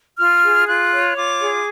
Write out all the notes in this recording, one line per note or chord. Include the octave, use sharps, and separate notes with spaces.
F4 F6
G#4
F4 F#6
C#5
F4 D6
G#4